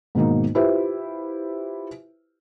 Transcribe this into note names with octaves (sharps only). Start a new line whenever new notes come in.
G#2 B2 D#3 A#3 D#4
E4 F4 G4 B4 C5 E5